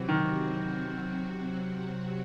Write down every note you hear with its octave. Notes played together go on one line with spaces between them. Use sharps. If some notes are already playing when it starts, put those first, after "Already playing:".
Already playing: C3 E3 F#3 C4 F#4
D#3